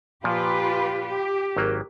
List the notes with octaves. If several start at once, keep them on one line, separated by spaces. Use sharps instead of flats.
A#2 F3 F4 G4 B4
G4
G#1 F#3 A#3